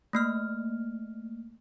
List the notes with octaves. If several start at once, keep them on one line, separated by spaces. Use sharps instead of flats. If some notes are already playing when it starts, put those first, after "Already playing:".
A3 A#3 F6